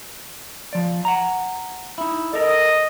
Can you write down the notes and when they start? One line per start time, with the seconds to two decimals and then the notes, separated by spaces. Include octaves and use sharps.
0.73 F3 D5
1.05 F#5 A#5
1.98 D#4 E4
2.33 A4 A#4 D#5